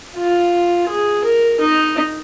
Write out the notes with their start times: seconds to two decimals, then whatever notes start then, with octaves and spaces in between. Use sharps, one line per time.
0.17 F4
0.89 G#4
1.24 A#4
1.60 D#4